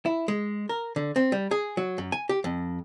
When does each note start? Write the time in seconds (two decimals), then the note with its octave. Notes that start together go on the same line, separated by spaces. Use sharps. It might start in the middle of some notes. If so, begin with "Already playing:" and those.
0.06 E4
0.28 G#3
0.69 A#4
0.96 D3
1.16 C4
1.32 G3
1.51 G#4
1.77 F#3
1.98 F#2
2.12 G#5
2.29 G4
2.44 F2